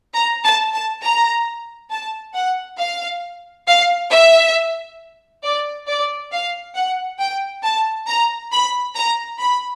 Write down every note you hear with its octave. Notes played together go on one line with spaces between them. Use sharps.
A#5
A5
A5
A#5
A5
F#5
F5
F5
E5
D5
D5
F5
F#5
G5
A5
A#5
B5
A#5
B5